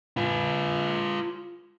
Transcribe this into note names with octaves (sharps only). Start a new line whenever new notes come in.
F4 B4